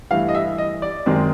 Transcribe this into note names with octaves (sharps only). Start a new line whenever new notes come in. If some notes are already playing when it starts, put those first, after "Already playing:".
G2 E3 A3 F5
D#5
E5
D#5
D5
F#2 D#3 G#3 C4